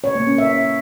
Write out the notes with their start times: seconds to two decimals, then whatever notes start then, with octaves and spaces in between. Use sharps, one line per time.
0.04 C#5
0.15 A#3
0.27 C#4
0.38 E5